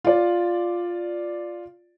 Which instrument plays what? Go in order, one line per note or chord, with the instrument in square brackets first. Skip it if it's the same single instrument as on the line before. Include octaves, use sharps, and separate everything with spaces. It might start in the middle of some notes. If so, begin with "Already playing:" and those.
[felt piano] F4 D5